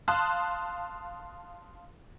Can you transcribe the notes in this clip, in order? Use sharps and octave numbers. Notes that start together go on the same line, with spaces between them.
F5 A5 C6 D#6 F#6